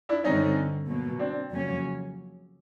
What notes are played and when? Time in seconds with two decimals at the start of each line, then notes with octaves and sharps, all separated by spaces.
0.09 D4 E4
0.24 G2 D3 G3 C4 C#4 D#4
0.87 B2 F#3 A#3
1.19 C4 D4
1.50 F2 C#3 F#3 A#3 C#4